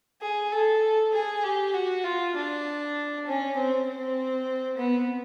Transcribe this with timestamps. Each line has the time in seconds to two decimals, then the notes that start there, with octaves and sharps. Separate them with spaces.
0.21 G#4
0.52 A4
1.13 G#4
1.44 G4
1.73 F#4
2.04 F4
2.35 D4
3.26 C#4
3.56 C4
3.86 C4
4.77 B3